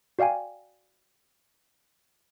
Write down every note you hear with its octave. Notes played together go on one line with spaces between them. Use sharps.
F#4 D5 F5 G5 G#5